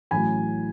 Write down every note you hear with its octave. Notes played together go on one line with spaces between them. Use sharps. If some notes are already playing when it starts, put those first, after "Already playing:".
A1 A2 F#3 A3 G#5 B5